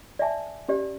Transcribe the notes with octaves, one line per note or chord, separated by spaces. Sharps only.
D5 E5 G#5 A5
C#4 G4 D5